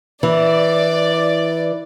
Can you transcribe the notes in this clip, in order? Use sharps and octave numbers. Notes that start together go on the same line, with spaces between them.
E3 D5